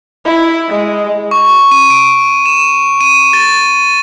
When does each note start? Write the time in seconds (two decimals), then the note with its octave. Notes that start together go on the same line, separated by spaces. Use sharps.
0.25 E4
0.69 G#3
1.31 C#6
1.72 D#7
1.90 D7
2.46 E7
3.01 D#7
3.33 A6